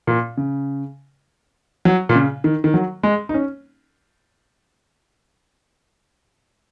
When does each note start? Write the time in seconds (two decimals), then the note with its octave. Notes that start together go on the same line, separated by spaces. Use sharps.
0.07 A#2
0.37 C#3
1.85 F#3
2.09 A#2
2.15 C#3
2.44 D#3
2.64 D#3
2.74 F#3
3.03 G#3
3.29 D#4
3.34 C#4